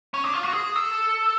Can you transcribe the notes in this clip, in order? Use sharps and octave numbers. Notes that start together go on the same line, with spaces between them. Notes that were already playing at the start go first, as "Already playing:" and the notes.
C#4
D4
F4
F#4
G#4
A4